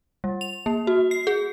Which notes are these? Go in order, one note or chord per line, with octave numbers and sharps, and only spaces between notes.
G3
F7
A#3
F#4
C7
G#4